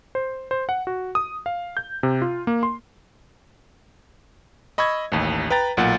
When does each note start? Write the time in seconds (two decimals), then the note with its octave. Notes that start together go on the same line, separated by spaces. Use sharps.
0.15 C5
0.51 C5
0.69 F#5
0.87 F#4
1.15 D#6
1.46 F5
1.77 G6
2.03 C3
2.22 F4
2.47 A#3
2.63 C6
4.78 D#5 B5 C#6 E6 G#6
5.12 A1 D#2
5.50 B4 G5 A#5 A6
5.77 B1 A#2 F#5 A6